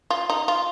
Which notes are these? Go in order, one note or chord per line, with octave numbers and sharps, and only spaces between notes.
F4
D#4
F4